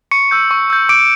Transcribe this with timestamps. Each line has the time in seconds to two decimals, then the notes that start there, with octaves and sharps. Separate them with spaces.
0.11 C#6 C#7
0.31 E6 G6
0.51 C#6
0.70 E6 G6
0.89 D6 D7